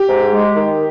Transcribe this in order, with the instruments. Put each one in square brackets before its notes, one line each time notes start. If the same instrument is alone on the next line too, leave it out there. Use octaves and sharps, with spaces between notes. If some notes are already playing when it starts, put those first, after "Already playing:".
Already playing: [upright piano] G4
[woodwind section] G#2
G#3
D#3